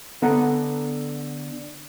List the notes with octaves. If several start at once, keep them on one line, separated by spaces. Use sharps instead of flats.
D3 B3 A4 F#5 A#5